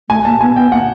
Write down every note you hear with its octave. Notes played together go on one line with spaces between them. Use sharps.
A3 G#5
A#3 A5
B3 G#5
B3 G5
A#3 F#5